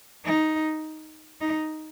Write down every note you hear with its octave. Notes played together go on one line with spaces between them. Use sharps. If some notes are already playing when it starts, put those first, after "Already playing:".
D#4
D#4